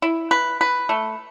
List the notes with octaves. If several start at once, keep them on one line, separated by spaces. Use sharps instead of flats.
E4
B4
B4
A3